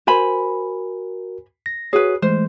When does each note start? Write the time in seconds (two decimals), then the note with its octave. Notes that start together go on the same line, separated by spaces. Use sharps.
0.07 F#4 A#4 C5 G#5 B5
1.66 A#6
1.93 F#4 G#4 B4 C#5
2.22 E3 G#3 A3 C5